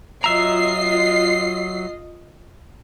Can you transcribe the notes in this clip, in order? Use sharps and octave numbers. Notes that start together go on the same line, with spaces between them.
F#3 F4 D#5 E5 A#5 C7